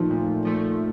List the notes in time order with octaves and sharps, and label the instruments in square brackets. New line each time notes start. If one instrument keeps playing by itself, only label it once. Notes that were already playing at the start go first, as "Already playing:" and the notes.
Already playing: [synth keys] A#2 F3 A3 [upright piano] D#3
[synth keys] A#2
F3 A3